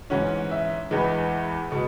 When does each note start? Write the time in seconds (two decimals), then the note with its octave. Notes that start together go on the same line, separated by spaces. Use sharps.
0.10 G#2 E3 C#4 F#5
0.51 E5
0.90 E2 E3 G#3 B4
1.71 B2 G#3 B3